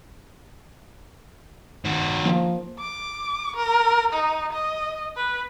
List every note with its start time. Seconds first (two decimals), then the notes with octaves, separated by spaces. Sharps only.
1.85 D#3 F#4
2.25 F3 A#3
2.79 D6
3.56 A#4
4.13 D#4
4.53 D#5
5.16 B4